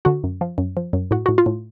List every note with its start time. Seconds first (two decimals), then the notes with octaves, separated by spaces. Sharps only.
0.05 D3 F#4
0.24 F#2
0.41 F3
0.58 F#2
0.77 F3
0.93 F#2
1.11 A2 F#4
1.26 A2 F#4
1.38 F4
1.46 A2